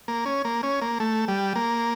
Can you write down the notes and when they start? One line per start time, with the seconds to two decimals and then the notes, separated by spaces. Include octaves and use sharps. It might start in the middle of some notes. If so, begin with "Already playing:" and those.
0.08 A#3
0.26 C#4
0.45 A#3
0.63 C#4
0.82 A#3
1.00 A3
1.28 G3
1.56 A#3